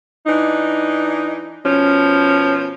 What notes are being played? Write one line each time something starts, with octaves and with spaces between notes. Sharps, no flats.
E3 D4 D#4
B2 F3 C#4